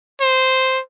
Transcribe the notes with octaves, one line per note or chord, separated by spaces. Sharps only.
C5